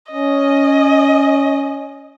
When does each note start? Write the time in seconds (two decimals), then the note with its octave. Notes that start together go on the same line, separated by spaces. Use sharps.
0.12 C#4 D#5